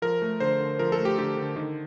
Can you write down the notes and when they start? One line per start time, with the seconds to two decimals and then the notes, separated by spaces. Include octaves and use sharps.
0.02 F3 A#4
0.22 A3
0.40 D3 C5
0.60 D3
0.79 F3 A#4
0.92 A4
0.99 A3
1.05 G4
1.18 D3 G4
1.37 D3
1.56 D#3